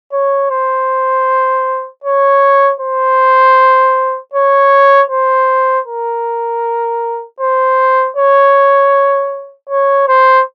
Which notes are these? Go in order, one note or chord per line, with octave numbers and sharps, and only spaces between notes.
C#5
C5
C#5
C5
C#5
C5
A#4
C5
C#5
C#5
C5